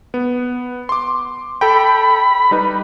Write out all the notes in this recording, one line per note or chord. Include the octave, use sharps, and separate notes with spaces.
B3
C6 D6
A4 G5 B5
G3 D#4 B4